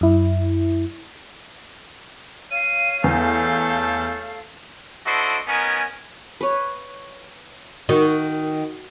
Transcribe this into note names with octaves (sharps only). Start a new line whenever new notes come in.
F#2 E4
C#5 F5 D#7
E2 A3 A4 G6
D4 E4 F#4 A4 C5 D#5
B3 C#4 D#4 A#4 G#5
B4 C#5
D#3 F#4